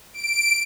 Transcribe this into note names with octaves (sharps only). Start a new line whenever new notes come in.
D7